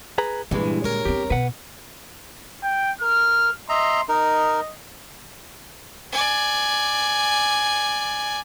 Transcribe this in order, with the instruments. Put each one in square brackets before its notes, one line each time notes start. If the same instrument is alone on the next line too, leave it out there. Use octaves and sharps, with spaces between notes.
[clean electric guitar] G#4 B4 A#5
[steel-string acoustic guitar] G2 E3 [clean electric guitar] A#2 G#3 [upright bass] D3
[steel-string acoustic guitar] A#4 C#5
[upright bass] E2 C4 [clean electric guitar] G4
[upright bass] B2 [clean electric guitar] B4 F#5
[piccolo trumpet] G5
[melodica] A#4 [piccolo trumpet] F6
[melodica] D#5 E5 A#5 [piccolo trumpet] C6
[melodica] D#4 A#4 [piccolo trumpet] D#5
[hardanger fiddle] D5 G#5